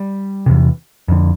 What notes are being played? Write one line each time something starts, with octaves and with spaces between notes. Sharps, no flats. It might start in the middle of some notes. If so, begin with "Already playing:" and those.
Already playing: G3
E2 C3
F2 D3